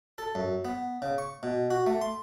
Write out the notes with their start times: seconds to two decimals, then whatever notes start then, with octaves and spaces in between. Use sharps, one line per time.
0.18 A4
0.35 F#2
0.65 B3
1.02 C#3
1.18 C#6
1.43 B2
1.70 F#4
1.87 A3
2.01 C6